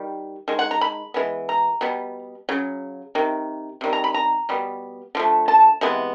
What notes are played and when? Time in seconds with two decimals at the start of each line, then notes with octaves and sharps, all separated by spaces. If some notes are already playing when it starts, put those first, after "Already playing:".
Already playing: D#3 G3
0.48 D#3 G#3
0.59 F#5
0.71 A#5
0.81 B5
1.14 E3 G#3 B3
1.49 A#5
1.81 B2 G3 B3
2.49 C#3 F#3
3.15 C3 D#3
3.81 C3 D#3 G3
3.93 A#5
4.04 B5
4.14 A#5
4.49 B2 G3 B3
5.15 D3 F3 A3
5.48 A5
5.81 C3 E3 G#3 B3